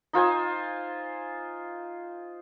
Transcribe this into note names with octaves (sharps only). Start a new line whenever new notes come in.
D#4 F4 C5 G#5